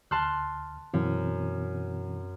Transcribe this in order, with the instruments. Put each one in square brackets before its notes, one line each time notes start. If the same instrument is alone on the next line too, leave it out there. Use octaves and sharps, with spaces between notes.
[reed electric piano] D2 F6 [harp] A5 C6 F#6
[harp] F#2 [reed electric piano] B2 E3 C4